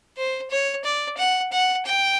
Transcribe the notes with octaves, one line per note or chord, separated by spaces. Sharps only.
C5
C#5
D5
F#5
F#5
G5